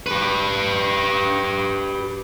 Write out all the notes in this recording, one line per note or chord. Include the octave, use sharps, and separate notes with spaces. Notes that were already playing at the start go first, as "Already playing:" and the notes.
G4 B4